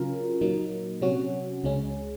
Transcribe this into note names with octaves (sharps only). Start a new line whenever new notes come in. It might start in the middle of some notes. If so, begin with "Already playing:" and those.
Already playing: C#3 F#3 C#4 F4 A#4
A#2 F#3 A#3 D#4
C3 F#3 C#4 F#4
C#2 C#3 G#3 C#4